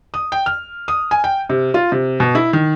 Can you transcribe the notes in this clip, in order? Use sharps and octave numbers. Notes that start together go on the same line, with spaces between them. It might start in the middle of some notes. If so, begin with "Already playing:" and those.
D#6
G5
F6
D#6
G#5
G5
C3
F4
C3
B2
E4
D#3